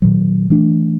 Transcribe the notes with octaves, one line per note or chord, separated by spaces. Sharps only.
A#2 D#3 F#3
E3 A3 D4